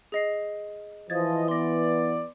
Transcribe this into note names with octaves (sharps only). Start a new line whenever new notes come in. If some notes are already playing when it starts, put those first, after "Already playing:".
G#4 D#5 C7
E3 F3 D#5 G#6 A6
B3 D5 C6 A#6